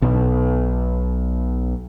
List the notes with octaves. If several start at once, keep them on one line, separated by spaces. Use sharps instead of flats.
B1 B2